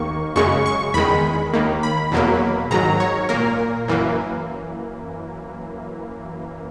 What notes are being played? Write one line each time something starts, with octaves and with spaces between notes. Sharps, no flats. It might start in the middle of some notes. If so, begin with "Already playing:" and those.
Already playing: D#2 D#3 A#3 C#6
F#2 C#3 G#3 C#6
C#6
E2 D#3 G#3 B5
D#2 D#3 A#3
B5
E2 B2 F#3 A#3
G#2 D#3 F#3 A#5
C#5
A#2 A#3 A#4
F#2 E3 A#3